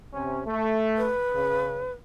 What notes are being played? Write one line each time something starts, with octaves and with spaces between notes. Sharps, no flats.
C3 C#4
A3
B4
C#3